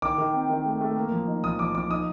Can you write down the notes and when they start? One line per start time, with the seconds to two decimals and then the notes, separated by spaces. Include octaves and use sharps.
0.02 D#3 D6
0.18 D#3
0.34 C4
0.50 D#3
0.66 A3
0.81 A3
0.96 A#3
1.12 F3
1.27 D#4
1.44 F3 D#6
1.59 F3 D6
1.75 F3 D6
1.91 D#4 D#6